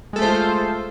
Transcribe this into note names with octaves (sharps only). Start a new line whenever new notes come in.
G#3 A3 F4 A4 C5